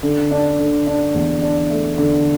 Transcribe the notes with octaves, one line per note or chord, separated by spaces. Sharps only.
D3
D4
D3
D4
E2
D4
A3
D3